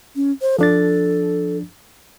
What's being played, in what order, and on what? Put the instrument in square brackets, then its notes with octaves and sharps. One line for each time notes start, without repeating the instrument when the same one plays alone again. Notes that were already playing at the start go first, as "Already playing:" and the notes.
[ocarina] C#4
C5
[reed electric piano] F3 D4 A6 [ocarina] A4